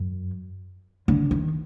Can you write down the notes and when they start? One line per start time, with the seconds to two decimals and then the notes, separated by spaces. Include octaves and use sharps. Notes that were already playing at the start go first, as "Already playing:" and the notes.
Already playing: F#2
1.08 D3
1.31 D#3